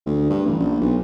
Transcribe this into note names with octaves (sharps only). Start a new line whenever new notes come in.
D2
G2
A1
A#1
B1